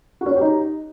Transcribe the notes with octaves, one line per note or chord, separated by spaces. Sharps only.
F#4
C#4
C#5
G4
D#4